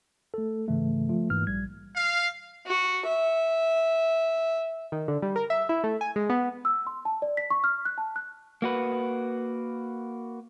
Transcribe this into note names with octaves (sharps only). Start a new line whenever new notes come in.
A3 A4
G#2 C#3 E3 A3
F3 A3 F4
G#2 E3 A#3 F6
A#1 G3 G#6
F5
F#4
E5
D#3
D3
G3
A#4
E5
E4
A3
G#5
G#3
B3
E6
C6
A5
D5
B6
C#6
F6
F#6
A5
F#6
A#3 F#4 B4